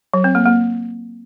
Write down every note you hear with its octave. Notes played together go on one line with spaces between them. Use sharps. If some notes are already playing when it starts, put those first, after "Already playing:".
F#3
C4
A#3
A#3